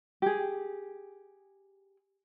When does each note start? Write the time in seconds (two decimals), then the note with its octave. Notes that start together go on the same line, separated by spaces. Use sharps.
0.22 G4 G#4